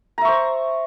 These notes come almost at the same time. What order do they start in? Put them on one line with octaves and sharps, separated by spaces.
A#5 E5 C#6 C5